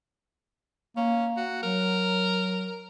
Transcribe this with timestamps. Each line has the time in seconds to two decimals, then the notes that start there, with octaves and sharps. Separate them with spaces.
0.96 A#3 C#4
1.37 F#4
1.63 F#3 A#4